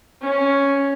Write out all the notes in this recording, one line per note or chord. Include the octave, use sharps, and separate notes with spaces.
C#4